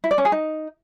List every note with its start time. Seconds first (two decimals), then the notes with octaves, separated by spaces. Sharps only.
0.04 E4
0.11 D5
0.18 C#4
0.25 G#4
0.32 D#4